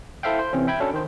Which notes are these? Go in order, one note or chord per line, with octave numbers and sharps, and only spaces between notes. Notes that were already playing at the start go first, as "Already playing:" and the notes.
E4 A4 C5 E5 F5 G5
C5
C3 E3 C4 C#4
E5 G5 B5 G#6
C#4 D4 F#4 A4 C#5
D#3 C5